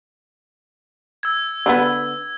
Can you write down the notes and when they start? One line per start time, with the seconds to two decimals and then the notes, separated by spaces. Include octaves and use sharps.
1.23 E6 G#6
1.66 D3 G#3 B3